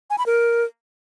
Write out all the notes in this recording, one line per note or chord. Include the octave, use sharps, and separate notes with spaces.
G#5
B5
A#4